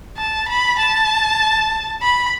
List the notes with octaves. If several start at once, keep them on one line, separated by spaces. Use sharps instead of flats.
A5
B5
A5
B5